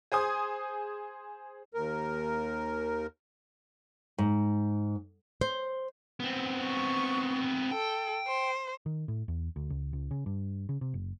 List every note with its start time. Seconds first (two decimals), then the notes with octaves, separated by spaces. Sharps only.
0.12 G#4 C5 G#5 D#6
1.74 D#2 A#4
4.18 G#2
5.41 C5
6.20 B3 C4
6.65 C#6
7.71 A4 G5
8.28 C5
8.86 D#3
9.08 A2
9.28 E2
9.56 D2
9.70 C#2
9.93 C#2
10.11 C#3
10.26 G2
10.69 C#3
10.81 C3
10.94 F#1